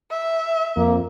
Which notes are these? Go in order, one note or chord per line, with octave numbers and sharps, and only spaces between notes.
E5
F2 A#3